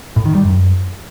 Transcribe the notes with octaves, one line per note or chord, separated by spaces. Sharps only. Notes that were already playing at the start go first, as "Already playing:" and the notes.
A2
D#3
G3
F#2